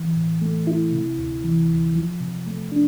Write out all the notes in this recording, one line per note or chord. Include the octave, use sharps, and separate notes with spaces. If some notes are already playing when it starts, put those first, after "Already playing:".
Already playing: E3
A2
A3
E4
C3
D2
E3
D2
F3
C3
A3
D4